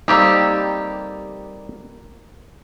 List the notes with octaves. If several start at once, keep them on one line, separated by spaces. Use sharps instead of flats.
G3 A#3 C4 D#4 G4 A4